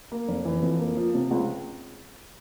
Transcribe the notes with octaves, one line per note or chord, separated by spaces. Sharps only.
A#3
F1
E3
F2
A#3
F3
C3
C#2